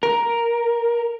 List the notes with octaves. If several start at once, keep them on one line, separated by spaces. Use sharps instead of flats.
A#4